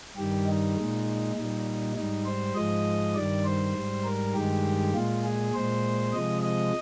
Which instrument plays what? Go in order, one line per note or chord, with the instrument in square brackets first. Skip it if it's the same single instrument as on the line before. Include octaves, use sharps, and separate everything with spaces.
[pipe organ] G2 D#3 G3 G4
D#4
A#2 G#3
A#2 G3 D#4
G#2 G3 D#4
C5
G#2 F3 G#3 D#5
G2 D#3 G3 D5
C5
G#2 G3
A#4
G2 D#3 G#3 G4
A#2 G#3 F4
G#4
A#2 G#3 C5
C3 F3 G#3 D#5
D#5